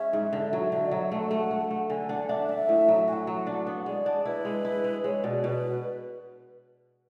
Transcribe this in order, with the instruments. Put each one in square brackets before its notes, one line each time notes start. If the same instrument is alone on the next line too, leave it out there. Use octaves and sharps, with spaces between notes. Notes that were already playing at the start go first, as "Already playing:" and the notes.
Already playing: [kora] G#3 C#4 [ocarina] E5
[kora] G#2
D3
F#3
[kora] D3 [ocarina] E5
[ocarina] D5
[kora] F#3
[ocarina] E5
[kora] A3 [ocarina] F#5
[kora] A3
A3
A3
[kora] D3 [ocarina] G#5
[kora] D4 [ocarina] F#5
[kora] D4 [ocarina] E5
[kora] D4
A2
F#3
[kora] F#4 [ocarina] G#5
[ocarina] F#5
[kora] F#3
D4
B3
[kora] G#3 [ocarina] D5
[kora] D4
[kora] E4 [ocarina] B4
[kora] G#3
E4
G#3
[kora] G#3 [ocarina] C#5
[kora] B2 [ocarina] D5
[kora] B2 [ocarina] B4